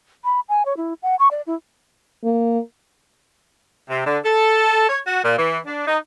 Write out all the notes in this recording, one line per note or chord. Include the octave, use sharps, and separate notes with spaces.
B5
G#5
C#5
E4
F#5
C#6
D5
E4
A#3
C3
D3
A4
C#5
F#4
A#2
E3
D4
D#4